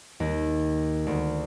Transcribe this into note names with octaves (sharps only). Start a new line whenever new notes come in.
D#2
D2